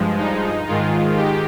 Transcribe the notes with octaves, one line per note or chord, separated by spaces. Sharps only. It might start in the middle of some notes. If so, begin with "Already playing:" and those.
Already playing: G2 F3 G#3
D#4
G#2 D#3 G#3 F4
G4